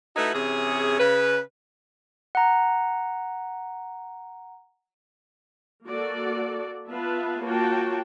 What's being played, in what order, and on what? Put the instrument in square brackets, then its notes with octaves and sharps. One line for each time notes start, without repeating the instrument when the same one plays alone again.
[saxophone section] A3 D#4 E4 F#4 B4
C3 E3 C#4 G#4
C#3 B4
[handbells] F#5 A#5
[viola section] A#3 F#4 A4 D5
B3 F4 B4 E5 F5 A5
A#3 F4 F#4 C#5 G5 A5